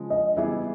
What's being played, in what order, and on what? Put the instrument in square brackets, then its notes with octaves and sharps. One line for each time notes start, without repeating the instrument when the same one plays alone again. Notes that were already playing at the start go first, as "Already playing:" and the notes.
Already playing: [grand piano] C#3 F3 G#3
[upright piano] D#5
[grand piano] E3 G3 B3 E4 G#4 [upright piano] E5